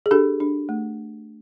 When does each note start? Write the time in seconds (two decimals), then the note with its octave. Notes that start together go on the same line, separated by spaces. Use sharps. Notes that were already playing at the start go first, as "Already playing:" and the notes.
0.06 G#4
0.11 D4 G4 A4
0.40 D4
0.69 A3